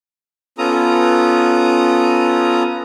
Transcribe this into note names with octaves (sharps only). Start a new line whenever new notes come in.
B3 C#4 F4 A4 A#5 D#6